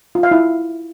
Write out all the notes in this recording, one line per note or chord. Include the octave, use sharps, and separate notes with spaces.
F4
F5
E4